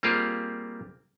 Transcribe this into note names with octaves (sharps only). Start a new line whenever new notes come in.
G3 A#3 C4 F4 G4 G#4